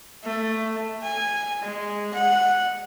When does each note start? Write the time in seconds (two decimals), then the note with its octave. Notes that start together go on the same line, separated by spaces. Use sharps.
0.25 A3
1.03 G#5
1.62 G#3
2.14 F#5